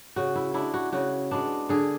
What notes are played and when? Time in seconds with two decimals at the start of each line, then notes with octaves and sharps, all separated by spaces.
0.16 C#3 F#4
0.36 E4
0.54 G#3 D4 E4
0.74 F#4
0.92 C#3 F#4
1.31 G#3 B3 D4
1.69 D3 G#4